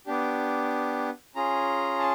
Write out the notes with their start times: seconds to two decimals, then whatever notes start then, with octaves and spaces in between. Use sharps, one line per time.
0.07 B3 D4 G4
1.35 C#4 F4 G#4 A#5
1.99 A5